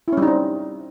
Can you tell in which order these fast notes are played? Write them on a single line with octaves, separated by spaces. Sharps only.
E4 C#4 G3 D#4 C4